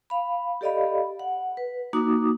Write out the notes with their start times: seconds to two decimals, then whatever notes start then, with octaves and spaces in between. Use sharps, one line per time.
0.10 F5 B5
0.61 G4 A4 D5 D#5 F5 B5
1.19 F#5
1.57 B4
1.93 A#3 D#4 F#4 D6 D#6